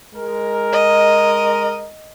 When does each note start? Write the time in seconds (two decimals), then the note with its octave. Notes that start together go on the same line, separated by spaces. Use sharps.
0.14 G#3 A#4
0.72 D#5